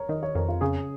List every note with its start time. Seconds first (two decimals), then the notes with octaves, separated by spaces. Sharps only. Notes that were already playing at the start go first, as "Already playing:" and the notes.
Already playing: A#4 C#5
0.09 D#3 D#5
0.23 C#5
0.35 F2 A#4
0.48 F4
0.61 C#3 G#4